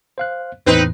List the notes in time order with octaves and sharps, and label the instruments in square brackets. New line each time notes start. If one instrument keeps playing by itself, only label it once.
[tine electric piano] C5 F5 F#6
[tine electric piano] E2 A2 E3 [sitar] C4 D#4 B4